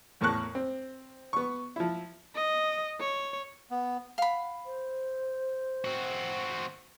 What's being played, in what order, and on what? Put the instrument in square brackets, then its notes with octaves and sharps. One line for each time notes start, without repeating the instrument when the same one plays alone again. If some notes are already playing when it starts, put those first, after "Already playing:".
[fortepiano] E2 A2 A#4 A5 C#6 F#6
C4
B3 C#6
F3 E4
[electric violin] D#5
C#5
[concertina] B3
[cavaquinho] F5 B5 [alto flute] F#5
[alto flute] C5
[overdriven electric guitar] C4 F#4